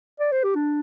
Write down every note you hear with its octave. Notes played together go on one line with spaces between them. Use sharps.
D5
C5
G4
D4